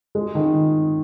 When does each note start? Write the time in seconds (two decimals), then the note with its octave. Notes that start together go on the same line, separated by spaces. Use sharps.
0.15 G#3
0.35 D#3